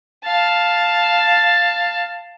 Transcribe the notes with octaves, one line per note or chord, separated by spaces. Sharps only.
F5 A5